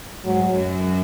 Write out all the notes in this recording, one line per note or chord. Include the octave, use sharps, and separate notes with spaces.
G#2 F#3 G#3
F#2 F#3